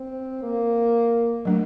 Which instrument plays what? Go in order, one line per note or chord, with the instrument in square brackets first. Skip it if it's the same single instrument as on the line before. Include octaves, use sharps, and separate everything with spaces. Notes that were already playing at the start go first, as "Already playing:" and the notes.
Already playing: [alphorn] C4
A#3
[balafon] F#3 A3 D4